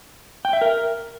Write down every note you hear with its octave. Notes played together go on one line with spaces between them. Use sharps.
G5
E5
A#4